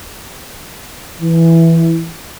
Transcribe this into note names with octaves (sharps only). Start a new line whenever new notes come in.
E3